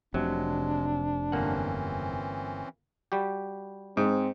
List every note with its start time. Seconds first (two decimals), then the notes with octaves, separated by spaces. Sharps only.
0.14 F1 C3 F#3 G#3 D4
1.32 G1 E3 A#3 C4 C#4 F#5
3.12 G3 F#4 G4
3.97 G#2 C4